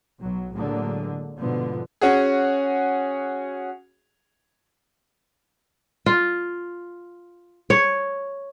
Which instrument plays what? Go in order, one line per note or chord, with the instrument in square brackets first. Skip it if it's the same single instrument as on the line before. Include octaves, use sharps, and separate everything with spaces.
[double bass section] B1 F#3
A2 D3 F#3 G#3 A#3
G#2 B2 D3 F3 B3
[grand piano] C#4 F#4 G#4
[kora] F4
C#5